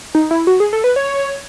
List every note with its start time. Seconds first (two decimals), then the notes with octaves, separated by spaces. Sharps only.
0.15 D#4
0.31 E4
0.47 F#4
0.60 G#4
0.73 A4
0.84 B4
0.96 C#5